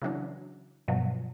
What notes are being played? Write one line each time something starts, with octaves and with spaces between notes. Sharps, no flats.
C#3 E3 F#3 D4
G2 B2 F3 F#3